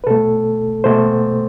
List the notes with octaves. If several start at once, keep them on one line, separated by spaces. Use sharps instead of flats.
B4
B2 A3 A4
B2 A3 C5